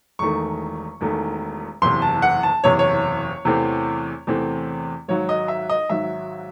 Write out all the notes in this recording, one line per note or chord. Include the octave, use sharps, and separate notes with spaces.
E1 E2 D#3 A3 C#6
E1 E2 D#3 A3
F#1 E2 C3 C6
A5
F#5
A5
F#1 E2 C3 C#5
C#5
E2 C3 E3 A3 C4
E2 C3 E3 A3 C4
G#1 G#2 F#3 C#5
D#5
E5
D#5
G#1 G#2 F#3 E5